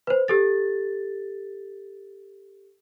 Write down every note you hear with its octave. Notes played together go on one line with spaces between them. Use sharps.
B4 C5
G4 A4 A6